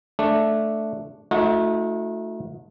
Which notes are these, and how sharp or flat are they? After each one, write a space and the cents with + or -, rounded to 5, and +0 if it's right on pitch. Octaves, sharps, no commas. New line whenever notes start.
A3 +0 D4 +0
A3 +0 D#4 +30 F#4 -40